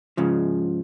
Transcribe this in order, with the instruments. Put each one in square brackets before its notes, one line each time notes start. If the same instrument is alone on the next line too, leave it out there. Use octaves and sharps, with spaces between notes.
[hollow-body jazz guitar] G#2 C#3 F3